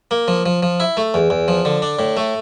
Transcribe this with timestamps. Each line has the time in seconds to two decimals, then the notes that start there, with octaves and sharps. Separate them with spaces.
0.11 A#3
0.28 F3
0.46 F3
0.63 F3
0.80 E4
0.97 A3
1.14 E2
1.30 E2
1.48 F3
1.65 D3
1.82 D4
1.99 A2
2.17 A3